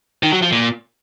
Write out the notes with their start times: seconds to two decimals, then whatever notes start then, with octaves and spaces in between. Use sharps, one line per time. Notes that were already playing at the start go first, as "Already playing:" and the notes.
0.23 D#3
0.33 F#3
0.42 F3
0.52 A#2